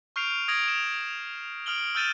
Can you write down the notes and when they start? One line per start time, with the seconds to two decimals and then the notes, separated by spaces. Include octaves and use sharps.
0.16 C#6 F6 G6 C7 D7 F7
0.48 D#6 G#6 A#6 D7 F#7
0.68 E7
1.66 D#6 F6 D7 F#7 G7
1.95 E6 F6 G6 A6 D#7 E7